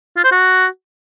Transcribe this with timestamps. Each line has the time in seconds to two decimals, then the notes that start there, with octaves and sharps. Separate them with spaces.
0.16 F4
0.24 C5
0.32 F#4